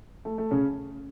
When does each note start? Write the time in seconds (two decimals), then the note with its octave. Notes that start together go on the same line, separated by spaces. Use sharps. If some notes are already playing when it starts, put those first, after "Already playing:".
0.25 A3
0.38 A3
0.51 C#3 C#4